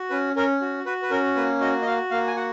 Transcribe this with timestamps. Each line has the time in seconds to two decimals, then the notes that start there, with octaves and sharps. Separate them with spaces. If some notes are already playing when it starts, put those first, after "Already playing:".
Already playing: F#4
0.10 C#4 B4
0.36 C#4 A#4
0.61 F#4
0.86 F#4 B4
1.02 B4
1.11 C#4 A#4
1.36 A#3 B4
1.61 F#4 D#5
1.82 D#5
1.86 F#4 F5
2.11 A#3 F5
2.27 G#5
2.36 F#4 F#5